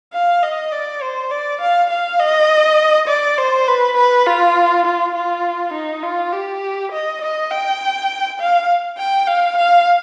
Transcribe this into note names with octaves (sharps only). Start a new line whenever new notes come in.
F5
D#5
D5
C5
D5
F5
F5
D#5
D5
C5
B4
B4
F4
F4
F4
D#4
F4
G4
D#5
D#5
G5
F5
G5
F5
F5